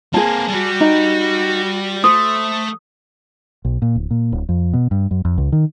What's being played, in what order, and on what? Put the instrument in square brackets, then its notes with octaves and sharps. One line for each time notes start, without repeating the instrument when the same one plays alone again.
[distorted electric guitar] A#3 C4 [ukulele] G#4 A5
[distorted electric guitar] G3 G4 [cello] F#4
[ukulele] D#4
[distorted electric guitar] A3 [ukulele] C5 [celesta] D#6
[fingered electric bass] B1
A#2
D1
A#2
D1
F2
B2
G2
F#2
F2
C#2
D#3